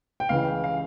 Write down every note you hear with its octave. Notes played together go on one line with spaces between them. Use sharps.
G5
C#2 C#3 E3 F5
F5